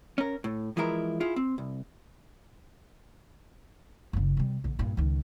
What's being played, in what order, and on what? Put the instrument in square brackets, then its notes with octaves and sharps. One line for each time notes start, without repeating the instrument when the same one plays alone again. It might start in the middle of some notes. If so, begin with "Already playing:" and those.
[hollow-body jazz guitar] C#4 A#4
A2
E3 F3 G#3 E4 A#4
E4 F4 G#4
C4
C2
[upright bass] F#1 C#3
C3 G3
A#1 D3
G2 A#2
C#2 D#3